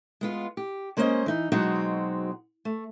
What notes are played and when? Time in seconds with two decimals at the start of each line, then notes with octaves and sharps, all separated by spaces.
0.21 G#3 B3 F4
0.57 G4
0.97 G#3 A#3 C#4 G#4 C5 D#5
1.26 E3 D#4
1.52 B2 F#3 G#3 C4 D#4 F#4
2.65 A3